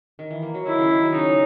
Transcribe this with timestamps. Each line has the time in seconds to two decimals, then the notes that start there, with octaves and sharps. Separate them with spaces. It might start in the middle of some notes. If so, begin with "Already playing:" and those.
0.19 D#3
0.31 E3
0.42 A#3
0.54 F#3
0.67 D#3 E4
0.78 C#3
0.90 D#3
1.02 F#3
1.14 C#3 D#4